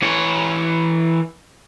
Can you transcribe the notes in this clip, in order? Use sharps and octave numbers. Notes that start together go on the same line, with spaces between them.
E3 C#5